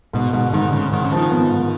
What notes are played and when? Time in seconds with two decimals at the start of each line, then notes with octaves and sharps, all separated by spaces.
0.13 G#2 B2
0.33 G#2 B2
0.53 G#2 D#3
0.72 G#2 C#3
0.92 G#2 D#3
1.05 C#3
1.12 D#3 F3
1.31 B3
1.51 G#2